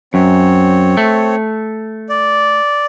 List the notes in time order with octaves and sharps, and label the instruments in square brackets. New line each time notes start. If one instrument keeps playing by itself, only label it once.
[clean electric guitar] F#2 [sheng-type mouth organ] C4 C#5
[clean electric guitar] A3
[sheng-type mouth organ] D5